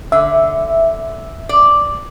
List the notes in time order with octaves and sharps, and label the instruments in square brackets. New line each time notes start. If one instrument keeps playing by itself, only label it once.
[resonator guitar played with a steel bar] D3 [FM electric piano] E5
[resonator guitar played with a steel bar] D5